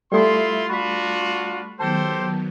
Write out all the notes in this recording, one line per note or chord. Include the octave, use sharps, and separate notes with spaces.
G3 A3 E4 F4 A4 E5 C6 D#6
D4 F4 F#4 B5 B6
D#3 F#3 B3 G4 A4 C5 A5